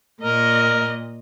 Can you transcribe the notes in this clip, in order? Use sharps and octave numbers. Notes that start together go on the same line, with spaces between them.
A#2 A#4 D#5